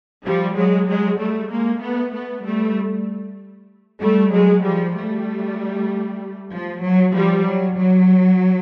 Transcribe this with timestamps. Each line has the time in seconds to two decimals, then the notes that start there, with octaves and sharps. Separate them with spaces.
0.25 F3 G3
0.56 F#3 G#3
0.88 F#3 G#3
1.19 G3 A3
1.50 G#3 A#3
1.81 A3 B3
2.13 A3 B3
2.44 G3 A3
4.01 G3 A3
4.32 F#3 G#3
4.64 F3 G3
4.95 G3 A3
6.53 F3
6.84 F#3
7.15 F3 G3
7.46 F#3
7.77 F#3